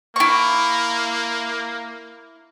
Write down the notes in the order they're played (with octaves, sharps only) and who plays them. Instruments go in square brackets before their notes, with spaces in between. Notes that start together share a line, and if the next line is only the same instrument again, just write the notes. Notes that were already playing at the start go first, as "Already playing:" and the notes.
[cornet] A#3 [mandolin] E4 C#6